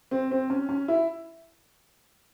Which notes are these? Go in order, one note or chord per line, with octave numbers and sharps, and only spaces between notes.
C4
C4
C#4
C#4
E4